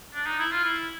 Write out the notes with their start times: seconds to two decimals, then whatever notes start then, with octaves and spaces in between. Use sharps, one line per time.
0.14 D4
0.26 D#4
0.39 E4
0.52 F4
0.64 E4